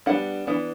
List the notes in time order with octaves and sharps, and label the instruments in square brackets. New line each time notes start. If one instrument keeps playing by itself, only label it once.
[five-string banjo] G3 B3 D4 F#5
E3 B3 D4